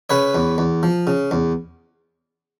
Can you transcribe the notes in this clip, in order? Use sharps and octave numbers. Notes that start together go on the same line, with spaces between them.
C#3 B4 C#5
E2
E2
F3
C#3
E2